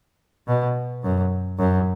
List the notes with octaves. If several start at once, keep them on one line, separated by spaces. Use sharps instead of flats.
B2
F#2
F#2